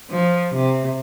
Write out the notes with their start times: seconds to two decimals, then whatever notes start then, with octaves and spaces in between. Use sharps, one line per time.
0.11 F3
0.55 C3